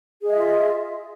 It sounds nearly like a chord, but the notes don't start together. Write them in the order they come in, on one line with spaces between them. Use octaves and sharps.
G#4 D#5 E5 F4